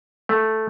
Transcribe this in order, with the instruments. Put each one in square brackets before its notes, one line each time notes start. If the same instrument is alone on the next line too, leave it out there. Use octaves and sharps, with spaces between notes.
[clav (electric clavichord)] A3